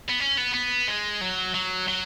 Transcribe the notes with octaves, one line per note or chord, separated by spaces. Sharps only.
B3
C#4
B3
B3
G#3
F#3
F#3
F#3